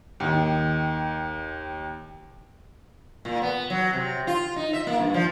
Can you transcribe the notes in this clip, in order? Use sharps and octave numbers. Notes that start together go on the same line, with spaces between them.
D#2 D#3
A#2
B3
F#3
C3
F4
D#4
E5
A#3
G2
F3